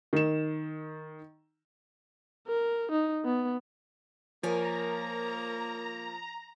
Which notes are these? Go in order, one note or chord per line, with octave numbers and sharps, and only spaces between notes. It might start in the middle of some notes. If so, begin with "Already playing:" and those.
D#3 E7
A#4
D#4
B3
F3 A#3 A#4 C#5 G#5 A#5